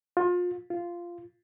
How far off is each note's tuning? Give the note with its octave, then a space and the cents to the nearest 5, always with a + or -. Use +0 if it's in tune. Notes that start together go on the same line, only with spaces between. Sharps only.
F4 +30
F4 -10